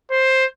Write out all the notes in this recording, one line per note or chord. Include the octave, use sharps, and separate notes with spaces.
C5